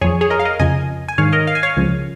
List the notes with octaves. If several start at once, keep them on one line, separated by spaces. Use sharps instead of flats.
F2 F3 G#4 C#5
G#4 C#5
A#4 D#5
F5
A#4 D#5
F2 C#3 F3 D#5 G#5
G#5
G#2 D#3 C#5 F5
A#4 D#5
F5
G#5
C#5 F5
C#2 C#3 F3